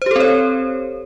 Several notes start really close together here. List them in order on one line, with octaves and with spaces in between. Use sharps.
C5 G4 A4 C4 C#5